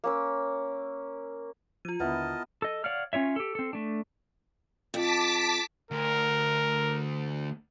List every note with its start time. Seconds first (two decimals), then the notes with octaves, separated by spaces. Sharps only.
0.04 A#3 C#4 E6
1.85 F3 F4 D#7
2.00 D#2 D3 B3 E4 A#4 D#5 A5
2.62 A4 D#5
2.84 C#5 D5 F5 F#5 F6
3.13 C#4 F4 C#5 E5
3.36 G4 A4
3.55 C4 A4
3.73 A3 D4
4.94 F2 A5 D6 B6
5.91 D2 A#4